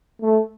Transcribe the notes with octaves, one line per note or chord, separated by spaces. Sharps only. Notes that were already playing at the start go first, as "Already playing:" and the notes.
A3